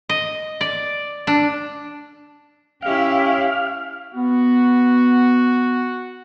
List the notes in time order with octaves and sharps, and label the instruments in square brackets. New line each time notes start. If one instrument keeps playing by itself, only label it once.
[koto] D#5
D5
D4
[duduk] C#4 [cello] E4 G4 [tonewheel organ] F5
[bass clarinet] B3 [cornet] F#4